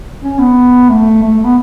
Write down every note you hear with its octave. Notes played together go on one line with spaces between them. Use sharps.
C#4
B3
A3
A3
B3